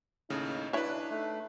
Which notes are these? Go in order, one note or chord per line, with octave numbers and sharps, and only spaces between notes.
D#2 A2 C#3 D#4
D4 E4 B4 C#5
A3